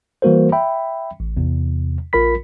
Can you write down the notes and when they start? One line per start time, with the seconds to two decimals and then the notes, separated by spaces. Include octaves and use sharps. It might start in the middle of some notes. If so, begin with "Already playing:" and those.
0.22 E3 G3 A#3 F#4 A#4 C5
0.52 E5 G5 B5
1.20 A1
1.37 E2 C3
2.13 A#1 F4 A#4 B5 B6